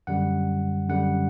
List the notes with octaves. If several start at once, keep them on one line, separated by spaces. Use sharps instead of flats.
F#2 D3 G3 F#5
F#2 D3 G3 F#5